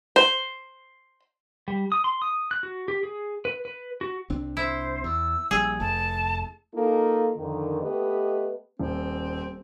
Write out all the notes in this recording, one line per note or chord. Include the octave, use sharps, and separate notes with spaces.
C5
G3
D#6
C6
D#6
F#6
F#4
G4
G#4
B4
B4
F#4
C2 C4 D4
E4 C5
E2 E6
A#1 G3 G#4
F1 F2 A3 A5
A#3 D#4 F4 A4
F2 D3 D#3
A3 B3 G4 B4 D#5
D#1 C4